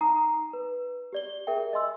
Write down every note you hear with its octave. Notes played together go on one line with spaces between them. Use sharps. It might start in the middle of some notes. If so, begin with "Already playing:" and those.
D#4 G#5 A#5 D#6 C7
B4
G4 D5 G7
G#4 A#4 E5 G5
D#5 G#5 C6 E6